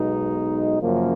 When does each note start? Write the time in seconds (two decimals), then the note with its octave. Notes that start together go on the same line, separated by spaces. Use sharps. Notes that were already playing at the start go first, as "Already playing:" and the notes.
Already playing: B1 B2 G#3 D#4
0.82 F#2 C#3 F3 A#3